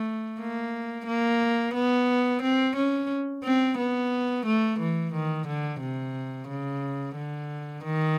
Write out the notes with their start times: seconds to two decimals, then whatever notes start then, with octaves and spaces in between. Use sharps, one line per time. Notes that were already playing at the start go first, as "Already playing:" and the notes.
Already playing: A3
0.40 A#3
1.07 A#3
1.74 B3
2.42 C4
2.76 C#4
3.44 C4
3.78 B3
4.46 A3
4.79 E3
5.14 D#3
5.47 D3
5.81 C3
6.48 C#3
7.16 D3
7.84 D#3